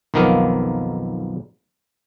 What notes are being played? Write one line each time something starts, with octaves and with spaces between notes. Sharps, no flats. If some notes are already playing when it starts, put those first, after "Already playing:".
B1 F2 D#3 A#3 B3 F5